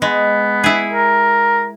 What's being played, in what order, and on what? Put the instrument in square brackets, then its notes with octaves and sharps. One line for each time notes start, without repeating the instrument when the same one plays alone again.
[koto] G#3 [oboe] B3
[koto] E4 G#4
[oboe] A#4